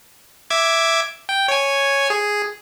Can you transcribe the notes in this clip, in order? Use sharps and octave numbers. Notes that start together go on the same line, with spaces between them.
E5 D6 G#6
G5
C#5 G#5
G#4